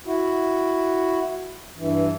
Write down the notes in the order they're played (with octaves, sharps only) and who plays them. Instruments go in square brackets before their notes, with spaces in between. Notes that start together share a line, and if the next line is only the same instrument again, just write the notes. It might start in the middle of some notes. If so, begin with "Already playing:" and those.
[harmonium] E4 F#4
G2 E3